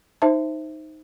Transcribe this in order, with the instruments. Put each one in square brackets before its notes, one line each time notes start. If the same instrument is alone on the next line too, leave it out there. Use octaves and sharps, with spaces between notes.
[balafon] D#4 C5 E5 A5